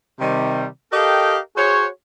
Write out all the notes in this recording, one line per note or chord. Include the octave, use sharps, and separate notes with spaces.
C3 D#3 G3
G4 A4 A#4 D#5 F5 G5
F#4 G#4 C5 C#5